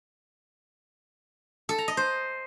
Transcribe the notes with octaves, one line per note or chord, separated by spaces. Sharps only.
A4
A#5
D#5
C5